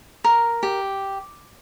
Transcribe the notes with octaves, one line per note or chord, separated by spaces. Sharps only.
A#4
G4